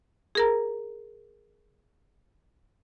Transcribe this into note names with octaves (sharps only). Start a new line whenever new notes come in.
G#4 A#4 A#5